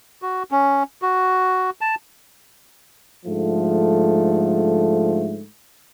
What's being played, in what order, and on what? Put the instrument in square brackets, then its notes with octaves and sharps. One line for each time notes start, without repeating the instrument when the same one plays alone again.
[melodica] F#4
C#4
F#4
A5
[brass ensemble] G#2 D3 F3 A3